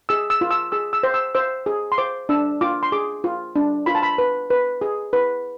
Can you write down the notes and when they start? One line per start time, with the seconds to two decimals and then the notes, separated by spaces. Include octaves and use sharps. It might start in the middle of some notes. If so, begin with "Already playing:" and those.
0.09 G#4 E6
0.30 E6
0.41 F4
0.51 E6
0.72 G#4 E6
0.93 E6
1.03 C5
1.14 E6
1.35 C5 E6
1.66 G#4
1.92 C6
1.98 C5 D6
2.29 D4 E6
2.61 F4 D6
2.83 C6
2.92 G#4 D6
3.24 F4
3.56 D4
3.86 F4 B5
3.95 A5
4.03 B5
4.18 B4
4.50 B4
4.81 G#4
5.13 B4